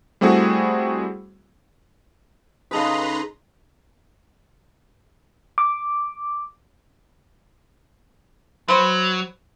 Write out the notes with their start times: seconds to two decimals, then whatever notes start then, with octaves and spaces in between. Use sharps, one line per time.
0.21 G3 A3 C4 E4 F#4 G#4
2.71 C#3 D#4 G#4 A4 B4 A#5 C6 D6
5.58 D6
8.68 F#3 B4 C5